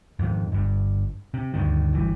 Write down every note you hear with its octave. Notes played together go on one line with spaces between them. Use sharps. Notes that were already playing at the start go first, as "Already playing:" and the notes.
F2 G#2 D#3
G1 G2
C3
D2 G2 D#3
G1 E3 G3